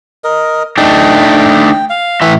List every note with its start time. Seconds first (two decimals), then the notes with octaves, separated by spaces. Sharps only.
0.24 A#4 D#5
0.78 A3 D4 D#4 G5
1.90 F5
2.22 A2 E3 E5